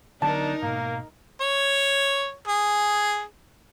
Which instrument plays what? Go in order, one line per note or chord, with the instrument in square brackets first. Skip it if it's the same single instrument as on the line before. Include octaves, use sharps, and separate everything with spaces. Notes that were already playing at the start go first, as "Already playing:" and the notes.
[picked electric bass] D3 F#3 B3 [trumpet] D4 [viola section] D#4 A#4 [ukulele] A5
[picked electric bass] G#2 B2 [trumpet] A#3
[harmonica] C#5
G#4